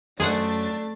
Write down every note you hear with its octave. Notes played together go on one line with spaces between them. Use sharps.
F#2 A3 D4 G#4 C5 F#5 A6